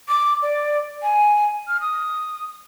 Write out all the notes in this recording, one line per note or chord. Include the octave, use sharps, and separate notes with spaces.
D6
D5
G#5
F6
D#6